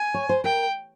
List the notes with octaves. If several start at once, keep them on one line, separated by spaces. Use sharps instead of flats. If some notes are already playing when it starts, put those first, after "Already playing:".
Already playing: G#5
C#5
C5
A#4 G5